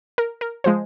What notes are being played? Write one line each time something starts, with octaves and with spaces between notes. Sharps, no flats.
A#4
A#4
F3 G#3 C5